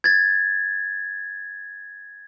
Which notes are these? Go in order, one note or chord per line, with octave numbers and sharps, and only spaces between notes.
G#6 A6